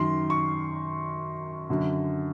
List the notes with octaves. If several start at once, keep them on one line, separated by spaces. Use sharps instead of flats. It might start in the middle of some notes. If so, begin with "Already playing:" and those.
Already playing: F#2 D#3 C6
C#6
F#2 D3